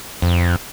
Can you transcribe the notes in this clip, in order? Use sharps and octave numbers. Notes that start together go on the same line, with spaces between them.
F2